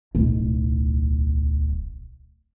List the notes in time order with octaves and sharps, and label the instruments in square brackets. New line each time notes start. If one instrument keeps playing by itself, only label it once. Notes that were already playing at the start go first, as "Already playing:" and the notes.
[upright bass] D1 B1